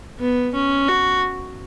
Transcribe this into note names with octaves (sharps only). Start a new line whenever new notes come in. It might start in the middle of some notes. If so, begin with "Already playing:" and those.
B3
C#4
F#4